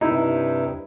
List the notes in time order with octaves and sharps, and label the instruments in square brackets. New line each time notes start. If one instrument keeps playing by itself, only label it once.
[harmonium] G2 C3 [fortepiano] D#4 E4